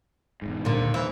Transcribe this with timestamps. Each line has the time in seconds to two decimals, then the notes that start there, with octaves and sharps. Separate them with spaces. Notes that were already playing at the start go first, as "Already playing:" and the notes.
0.42 E1 G#2
0.65 A#2 D3
0.79 D#2
0.94 E3